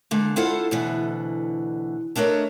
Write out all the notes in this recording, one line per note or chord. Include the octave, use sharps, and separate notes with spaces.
D3 G#3 A#3
E4 F4 A4 C5 F5 F#5
D2 B2 D3 E3
A3 D4 A#4 C#5 D#5